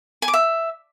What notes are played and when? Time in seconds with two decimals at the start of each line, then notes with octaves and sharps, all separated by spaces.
0.22 G#5
0.28 D6
0.34 E5